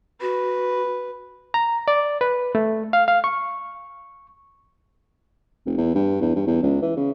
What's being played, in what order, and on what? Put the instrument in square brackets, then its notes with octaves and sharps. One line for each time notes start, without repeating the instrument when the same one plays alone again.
[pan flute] F#4 [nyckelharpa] B4
[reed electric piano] A#5
D5
B4
A3
F5
F5
C#6
[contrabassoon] F1
E2
G2
E2
G2
E2
C#2
E3
C#3